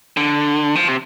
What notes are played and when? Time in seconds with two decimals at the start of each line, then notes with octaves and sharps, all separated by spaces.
0.17 D3
0.75 F3
0.88 C3